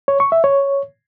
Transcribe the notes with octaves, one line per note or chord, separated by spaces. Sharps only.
C#5
C#6
E5
C#5